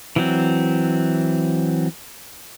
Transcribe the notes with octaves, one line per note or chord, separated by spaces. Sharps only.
E3 F#3 C4